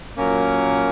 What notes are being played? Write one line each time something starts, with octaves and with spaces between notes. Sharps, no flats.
A#2 F#3 A#3 C#4 A#4